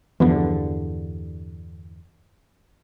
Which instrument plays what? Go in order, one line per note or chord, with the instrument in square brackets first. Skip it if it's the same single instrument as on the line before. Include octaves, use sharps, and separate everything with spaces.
[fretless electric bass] E2 G2 D3 [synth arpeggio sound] E3 F3 B3